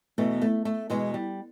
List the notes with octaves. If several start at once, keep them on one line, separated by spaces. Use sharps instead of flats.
E2 B2 A3
A3
A3
E2 B2 G#3
G3